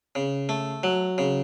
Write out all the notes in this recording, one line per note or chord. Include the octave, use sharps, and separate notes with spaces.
C#3
A3
F#3
C#3